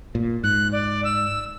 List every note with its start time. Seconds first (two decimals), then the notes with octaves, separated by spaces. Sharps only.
0.15 A#2
0.44 G#2 F#6
0.72 D5
1.05 E6